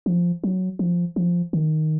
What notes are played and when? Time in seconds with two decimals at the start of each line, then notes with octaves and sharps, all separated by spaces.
0.06 F3
0.44 F#3
0.79 F3
1.16 F3
1.53 D#3